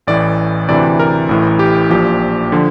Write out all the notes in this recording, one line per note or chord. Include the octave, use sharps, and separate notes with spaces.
A1 A2 E3 D5
D2 C3 E3 D5
A#4
A1 A2 E3
G4
A#1 A#2 F3 G4
D3 F3